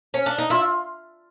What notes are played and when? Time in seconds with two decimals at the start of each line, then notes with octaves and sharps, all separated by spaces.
0.14 C#4
0.26 D4
0.38 D#4
0.50 E4 F4